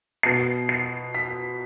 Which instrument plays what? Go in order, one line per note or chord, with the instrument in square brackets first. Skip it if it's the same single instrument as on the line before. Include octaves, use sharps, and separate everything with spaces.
[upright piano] B2 B3 C7
C7
B6